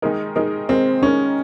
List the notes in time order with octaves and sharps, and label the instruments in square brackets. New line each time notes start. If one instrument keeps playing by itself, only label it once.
[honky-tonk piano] D#3 G#3 D#4 A#4
D#3 G#3 D#4 A#4
[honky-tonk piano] D#3 G#3 D#4 A#4 [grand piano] C4
[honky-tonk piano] D#3 G#3 D#4 A#4 [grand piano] C#4